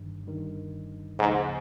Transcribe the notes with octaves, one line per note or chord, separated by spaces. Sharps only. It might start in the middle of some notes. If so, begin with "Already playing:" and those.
Already playing: G1 G2 D#3
G1 G2 D#3
D2 G#2 C#3 F3 A#3 C#4